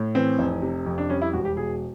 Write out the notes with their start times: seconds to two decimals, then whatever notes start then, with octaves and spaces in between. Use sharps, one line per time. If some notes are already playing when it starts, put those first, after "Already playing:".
Already playing: A2
0.15 E3 C4
0.39 F1
0.62 C3
0.86 F2
0.98 D4
1.10 G3 C#4
1.22 E4
1.33 E1 F#4
1.45 G4
1.57 B2 G#4